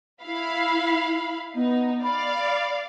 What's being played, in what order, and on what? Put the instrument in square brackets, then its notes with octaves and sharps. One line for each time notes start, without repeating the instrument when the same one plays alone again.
[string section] E4 F5 B5
[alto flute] B3 [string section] D#4
[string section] D5 F5 [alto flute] B5